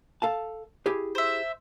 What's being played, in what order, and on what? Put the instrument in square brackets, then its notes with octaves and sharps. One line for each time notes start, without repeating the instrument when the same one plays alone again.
[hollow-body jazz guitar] A4 F5 A5
E4 G4 G#4
[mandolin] C5 E5